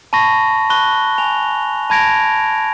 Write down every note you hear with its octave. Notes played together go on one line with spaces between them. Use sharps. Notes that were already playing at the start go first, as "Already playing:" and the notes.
A5 B5 C#6 A#6
A5 B5 C#6 F#6 G7
G#5 F7
A5 B5 G#6 A#6 D7 F7